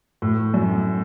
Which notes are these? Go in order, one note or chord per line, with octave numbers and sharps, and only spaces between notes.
A2
F#2